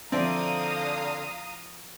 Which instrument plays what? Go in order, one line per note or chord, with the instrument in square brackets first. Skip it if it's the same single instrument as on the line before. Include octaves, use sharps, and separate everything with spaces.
[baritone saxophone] D3 [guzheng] F3 E4 D5 [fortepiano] C4 [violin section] F5 A#5 D#6